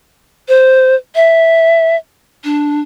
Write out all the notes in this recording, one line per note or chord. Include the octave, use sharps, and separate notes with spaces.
C5
E5
D4